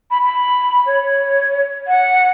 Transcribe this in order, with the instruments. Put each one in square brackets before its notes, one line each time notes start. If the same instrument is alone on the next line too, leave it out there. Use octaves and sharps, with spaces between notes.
[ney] B5
B5
C#5
F#5